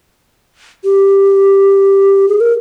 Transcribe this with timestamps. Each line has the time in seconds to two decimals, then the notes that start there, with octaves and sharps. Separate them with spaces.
0.84 G4
2.28 G#4
2.40 A#4